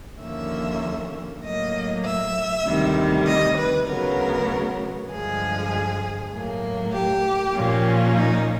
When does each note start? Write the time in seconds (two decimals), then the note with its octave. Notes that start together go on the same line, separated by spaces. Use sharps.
0.21 D#2 D3 F3 A#3 C#4 E5
1.43 A2 F#3 A#3 D#5
2.04 E5
2.65 D2 C3 D#3 G3
3.26 D#5
3.57 B4
3.87 D2 C#3 F#3 B3 A#4
5.09 G2 D3 F3 G#3 G#4
6.32 A2 F#3 A#3
6.92 G4
7.54 A#2 F3 A#3 C#4
8.15 D#4